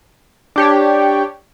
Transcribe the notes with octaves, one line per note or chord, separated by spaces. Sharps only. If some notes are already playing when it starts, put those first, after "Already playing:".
D4 G4 C#5